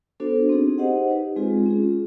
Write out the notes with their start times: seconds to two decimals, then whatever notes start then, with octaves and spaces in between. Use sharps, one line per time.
0.20 B3 D4 F#4 A4 C5
0.49 C4 D#4 G#4
0.78 D#4 G4 C5 D#5 F#5
1.08 D#4 G4 B4
1.36 G#3 C4 F4 G#4
1.66 C#4 F4 G#4